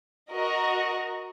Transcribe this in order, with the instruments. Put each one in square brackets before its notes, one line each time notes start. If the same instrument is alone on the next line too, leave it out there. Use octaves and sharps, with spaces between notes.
[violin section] F#4 A#4 D#5